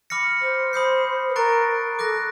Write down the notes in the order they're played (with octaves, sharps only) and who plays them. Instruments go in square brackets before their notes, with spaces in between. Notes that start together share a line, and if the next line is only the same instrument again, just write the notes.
[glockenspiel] B5 D6 F6 A#6 C#7
[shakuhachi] C5
[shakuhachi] C5 [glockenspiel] B5 D#6 G6 C7
[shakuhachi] B4
[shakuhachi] A#4 [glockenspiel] A#5 C#6 F#6 A6 D7
[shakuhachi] A4 [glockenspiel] D6 F#6 A#6